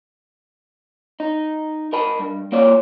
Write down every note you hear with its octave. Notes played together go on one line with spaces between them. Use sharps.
D#4
A#4 D#5 A5 B5
G2
A#3 F4 C#5 D5